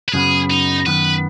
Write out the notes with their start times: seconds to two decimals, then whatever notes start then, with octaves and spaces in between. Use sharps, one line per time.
0.08 B4
0.13 F#2 C#3 F#3 B3 G#4
0.50 D#4
0.86 F#2 D#3 B3 B4